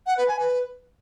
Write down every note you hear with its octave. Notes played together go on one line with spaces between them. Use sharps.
F#5
B4
G#5
B4